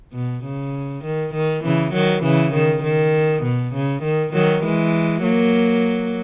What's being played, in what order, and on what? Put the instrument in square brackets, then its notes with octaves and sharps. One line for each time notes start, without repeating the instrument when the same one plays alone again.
[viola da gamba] B2
C#3
D#3
D#3
C#3 E3
D#3 F#3
C#3 E3
D#3
D#3
B2
C#3
D#3
D#3 F#3
E3 G#3
F#3 A#3